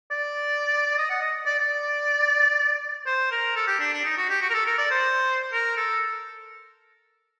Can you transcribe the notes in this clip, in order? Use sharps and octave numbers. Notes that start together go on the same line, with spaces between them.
D5
D#5
F#5
D#5
D5
D5
C5
A#4
A4
G4
D4
D4
D#4
F#4
G4
F#4
A#4
A4
A#4
D5
C5
A#4
A4